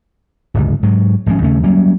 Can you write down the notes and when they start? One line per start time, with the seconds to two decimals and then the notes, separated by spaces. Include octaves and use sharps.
0.54 D1 G1 C#2
0.83 G#2 F#3
1.26 G#1 F3 G#3 C#4
1.42 D#2 C#3 A3 C#4
1.64 F#3 G3 A#3 C#4